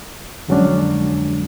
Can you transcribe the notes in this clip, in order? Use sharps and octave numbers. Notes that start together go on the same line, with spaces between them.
F2 D3 F#3 G#3 C#4 D4